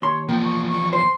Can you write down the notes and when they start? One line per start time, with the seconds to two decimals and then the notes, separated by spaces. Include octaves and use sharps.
0.02 D#2 C#5 C6
0.29 E2 F3 A#3 G5
0.43 C#6
0.68 C#6
0.93 C5 C6